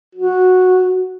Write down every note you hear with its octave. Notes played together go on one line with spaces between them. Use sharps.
F#4